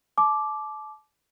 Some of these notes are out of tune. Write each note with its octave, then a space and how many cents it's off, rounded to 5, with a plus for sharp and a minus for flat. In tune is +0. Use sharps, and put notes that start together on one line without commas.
A5 -35 D6 +0